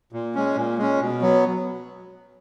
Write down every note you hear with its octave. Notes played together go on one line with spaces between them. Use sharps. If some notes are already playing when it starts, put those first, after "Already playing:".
A#2
G#3 C#4
A#2
G#3 C#4
B2
F#3 B3